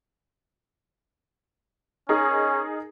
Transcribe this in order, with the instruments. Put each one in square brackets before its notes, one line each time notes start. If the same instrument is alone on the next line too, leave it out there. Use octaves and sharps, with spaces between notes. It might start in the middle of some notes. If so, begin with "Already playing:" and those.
[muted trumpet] C#4 [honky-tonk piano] D#4 G#4 A#4